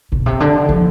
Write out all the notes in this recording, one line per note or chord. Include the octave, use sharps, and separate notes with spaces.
B2
C3
D3
F3